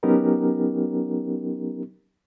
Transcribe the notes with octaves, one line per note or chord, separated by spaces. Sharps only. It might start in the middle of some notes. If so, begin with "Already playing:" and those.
F#3 B3 C#4 D#4 G4 A#4